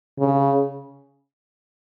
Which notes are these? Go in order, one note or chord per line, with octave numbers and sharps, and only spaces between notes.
C#3